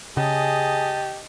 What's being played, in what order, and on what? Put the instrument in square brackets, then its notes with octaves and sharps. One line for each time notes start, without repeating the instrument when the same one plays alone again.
[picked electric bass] C#3 [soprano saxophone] G4 [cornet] G#4 [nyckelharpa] D#5 A5